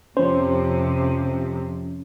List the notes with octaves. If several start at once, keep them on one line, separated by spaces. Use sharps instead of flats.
F2 C3 F3 C#4 C5